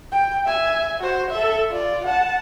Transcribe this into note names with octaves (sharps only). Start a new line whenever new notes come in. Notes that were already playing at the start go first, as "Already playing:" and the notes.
G5
E5 G#5
F#4 C5
A4 E5
F4 D5
F#5 A5